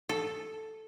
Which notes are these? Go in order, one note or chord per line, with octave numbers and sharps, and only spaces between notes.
A4